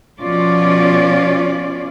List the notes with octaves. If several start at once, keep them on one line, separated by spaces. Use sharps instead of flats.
B2 F3 C#4 F4 D5